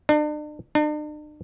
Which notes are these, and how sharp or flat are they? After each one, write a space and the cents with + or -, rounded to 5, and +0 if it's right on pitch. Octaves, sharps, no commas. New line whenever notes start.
D4 +40
D4 +45